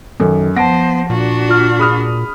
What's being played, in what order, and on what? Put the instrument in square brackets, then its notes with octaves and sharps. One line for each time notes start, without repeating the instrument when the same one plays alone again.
[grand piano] F#2 [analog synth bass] D#3 [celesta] A4
[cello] F3 C5 [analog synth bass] B3 [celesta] F#5 A5 [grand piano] A#6 D7
[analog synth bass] A#2 [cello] D4 F#4
[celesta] F4 F6
[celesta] G#4 [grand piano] B5 D#6 F6